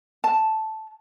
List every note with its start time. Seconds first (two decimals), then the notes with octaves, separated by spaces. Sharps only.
0.24 A5